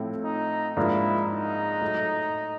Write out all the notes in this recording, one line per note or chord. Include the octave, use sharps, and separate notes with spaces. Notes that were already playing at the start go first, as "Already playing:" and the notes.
Already playing: A2 F3 A3 C4 E4
D#4
G#2 F3 A#3 D4 E4
D#4
A2 F#3 A3